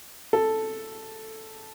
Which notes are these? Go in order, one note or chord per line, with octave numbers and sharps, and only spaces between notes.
A4